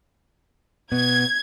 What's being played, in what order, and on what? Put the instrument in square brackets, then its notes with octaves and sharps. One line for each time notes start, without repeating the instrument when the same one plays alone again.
[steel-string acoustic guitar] B2 B3 [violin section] G#6